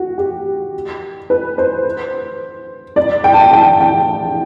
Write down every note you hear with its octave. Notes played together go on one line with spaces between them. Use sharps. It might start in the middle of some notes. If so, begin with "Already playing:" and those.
Already playing: F#4
G4
B4
C5
D5
G5
A5
G5
G5
G5